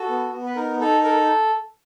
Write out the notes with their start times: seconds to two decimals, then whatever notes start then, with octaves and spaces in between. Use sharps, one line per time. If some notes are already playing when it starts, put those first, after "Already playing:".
Already playing: F#4 A4
0.09 B3
0.32 B3
0.46 B4
0.56 D#4 A#4
0.80 D#4 A4
1.03 A4 A#4